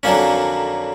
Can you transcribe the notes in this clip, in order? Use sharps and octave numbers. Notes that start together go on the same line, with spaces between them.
F2 D3 F#3 A#3 C#4